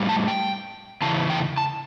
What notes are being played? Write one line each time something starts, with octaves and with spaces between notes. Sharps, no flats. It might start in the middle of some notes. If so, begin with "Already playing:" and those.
Already playing: A2 G3
A5
G5
E2 C#3 E4 A5
G5
A5